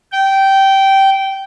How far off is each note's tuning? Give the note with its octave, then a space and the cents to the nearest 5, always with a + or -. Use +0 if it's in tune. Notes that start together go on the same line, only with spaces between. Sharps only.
G5 -15